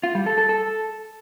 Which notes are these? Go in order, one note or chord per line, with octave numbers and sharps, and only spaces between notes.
F4
G3
A4
A4
A4